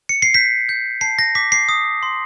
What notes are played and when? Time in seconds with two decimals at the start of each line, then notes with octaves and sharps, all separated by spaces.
0.09 C#7
0.22 C7
0.34 G6 B6
0.69 G6
1.01 A5 C7
1.19 A#6
1.35 D6 B6
1.52 C7
1.69 D#6
2.03 C6